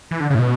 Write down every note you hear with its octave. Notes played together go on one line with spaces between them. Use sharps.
E3
D3
C#3
A2
B2